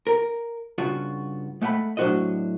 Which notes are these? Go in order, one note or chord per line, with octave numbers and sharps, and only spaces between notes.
A#4
G2 C#3 F4 F#4
G#3 A3 F#5 G5 B5
A2 F#3 D4 F#4 C5 D#5